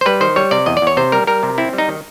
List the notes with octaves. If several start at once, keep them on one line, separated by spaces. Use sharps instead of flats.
C5
G3 B4
D#3 C5
G3 C#5
C3 D5
E2 D#5
D5
E2 C#5
C3 C5
G3 A#4
G3 A#4
C3
C4 E4
G3
D#4
D#3